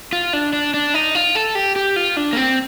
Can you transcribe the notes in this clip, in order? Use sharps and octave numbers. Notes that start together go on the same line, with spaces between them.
F4
D4
D4
D4
D#4
F4
A4
G4
G4
F4
D4
A#3
C4